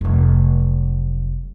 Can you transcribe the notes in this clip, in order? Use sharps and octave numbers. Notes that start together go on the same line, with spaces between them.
F1 F#3